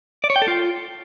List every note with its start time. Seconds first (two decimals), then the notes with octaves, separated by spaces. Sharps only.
0.24 D5
0.30 C#5
0.36 G5
0.42 A4
0.48 F4